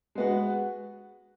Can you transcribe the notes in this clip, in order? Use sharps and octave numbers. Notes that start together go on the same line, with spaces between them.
G#3 B3 F#4